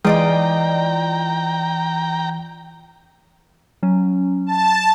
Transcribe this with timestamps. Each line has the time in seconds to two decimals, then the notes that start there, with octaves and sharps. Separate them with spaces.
0.05 E3 G#3 F4 D5 D#5 G5 A#5
3.83 F#3 C#4
4.46 A5